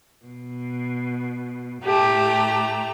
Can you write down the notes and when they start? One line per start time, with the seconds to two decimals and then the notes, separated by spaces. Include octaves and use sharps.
0.26 B2
1.85 A2 A3 G4 A#5